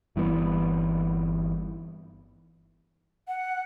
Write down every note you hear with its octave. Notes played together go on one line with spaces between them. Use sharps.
G1 E3 G3 B3
F#5